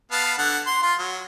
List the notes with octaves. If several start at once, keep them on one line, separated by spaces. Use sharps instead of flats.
B3 F5 A5
D3 F#5 A5
C6
F4 C6
F#3